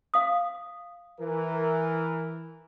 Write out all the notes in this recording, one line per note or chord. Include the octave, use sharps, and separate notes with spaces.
F5 D#6
E3 A#4